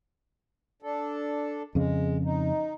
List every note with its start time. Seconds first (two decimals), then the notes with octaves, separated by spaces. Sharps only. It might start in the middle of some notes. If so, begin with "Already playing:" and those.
0.82 D4 A4
1.75 F2 C#3 G#3
2.24 D#4